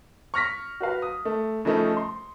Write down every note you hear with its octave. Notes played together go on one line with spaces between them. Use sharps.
C#6 F6 A#6 B6
F#4 B4 F5
D#6
A3
C#3 F3 A3 D#4
C6